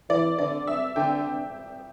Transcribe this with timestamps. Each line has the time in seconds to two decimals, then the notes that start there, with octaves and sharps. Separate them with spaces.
0.09 E3 D5
0.38 D3 D5
0.67 E5
0.96 D3 G5